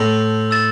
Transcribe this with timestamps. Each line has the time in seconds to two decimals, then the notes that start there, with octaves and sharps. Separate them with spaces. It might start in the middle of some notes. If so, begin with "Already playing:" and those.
Already playing: A2 A5 C6 E6 G6
0.51 E6 A6 E7